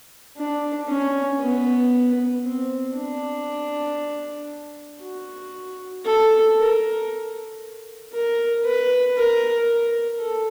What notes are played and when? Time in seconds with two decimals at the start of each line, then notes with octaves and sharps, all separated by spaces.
0.38 D4
0.88 C#4
1.40 B3
2.44 C4
2.96 D4
5.02 F#4
6.05 A4
6.58 A#4
8.13 A#4
8.65 B4
9.17 A#4
9.68 A#4
10.20 A4